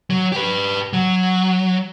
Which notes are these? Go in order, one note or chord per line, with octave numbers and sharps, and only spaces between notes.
F#3
G4 B4
F#3